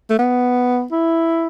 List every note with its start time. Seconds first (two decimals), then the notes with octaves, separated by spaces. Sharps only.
0.10 A3
0.19 B3
0.92 E4